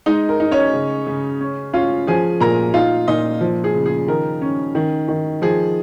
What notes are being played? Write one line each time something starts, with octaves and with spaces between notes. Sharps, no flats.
G#3 D#4 D#5
A#4
D#4
C#4 C#5
C#3
C#3
C#4
C#4 F4 F5
F3 G#4 G#5
A#2 A#4 A#5
D#4 F4 F5
A#2 D#4 D#5
F3
G#4
C#3
G#4
D#3 A#4
C#4
D#3
D#3
F3 G#4